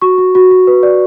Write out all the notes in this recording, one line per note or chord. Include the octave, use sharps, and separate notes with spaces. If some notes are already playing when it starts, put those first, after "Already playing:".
F#4 C#6
F#4
F#4
F#4
B4
D5